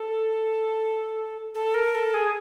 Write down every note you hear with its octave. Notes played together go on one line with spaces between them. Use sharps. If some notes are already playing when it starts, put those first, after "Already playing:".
Already playing: A4
A4
A#4
A4
G#4